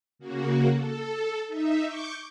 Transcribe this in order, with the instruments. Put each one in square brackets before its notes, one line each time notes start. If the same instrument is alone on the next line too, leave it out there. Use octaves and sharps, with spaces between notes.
[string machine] C#3 A#3 F#4
A4
D#4 E5
C#6 D6 G6